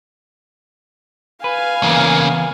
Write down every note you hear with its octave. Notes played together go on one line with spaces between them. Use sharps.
B4 F5 G#5
C#3 E3 A#3 B3